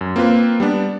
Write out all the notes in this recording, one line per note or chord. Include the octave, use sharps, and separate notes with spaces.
F#2
A#3 C4 F4 B4
G3 B3 D4